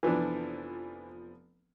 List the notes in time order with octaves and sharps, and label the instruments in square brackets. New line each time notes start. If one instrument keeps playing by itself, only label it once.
[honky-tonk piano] F1 F3 B3 [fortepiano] E3 D4